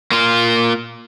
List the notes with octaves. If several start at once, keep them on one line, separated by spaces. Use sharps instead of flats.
A#3 F4